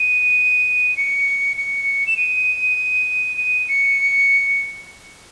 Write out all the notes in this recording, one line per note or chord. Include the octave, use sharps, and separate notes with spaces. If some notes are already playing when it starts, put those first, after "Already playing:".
Already playing: D#7
C#7
C#7
E7
D#7
D#7
C#7